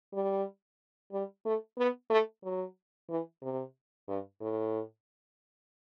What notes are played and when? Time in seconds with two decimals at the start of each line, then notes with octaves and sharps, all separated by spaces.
0.13 G3
1.12 G3
1.45 A3
1.77 B3
2.10 A3
2.44 F#3
3.09 E3
3.42 C3
4.08 G2
4.41 A2